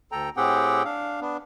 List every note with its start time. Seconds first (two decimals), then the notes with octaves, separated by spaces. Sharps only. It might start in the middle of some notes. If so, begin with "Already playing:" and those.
0.12 D2 A4 G5 A#5
0.37 A2 C4 G4 G#4 F#5 G5
0.85 D4 F5
1.21 B3 D4